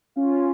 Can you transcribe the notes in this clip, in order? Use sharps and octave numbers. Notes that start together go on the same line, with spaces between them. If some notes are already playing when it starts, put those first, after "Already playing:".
C#4 F4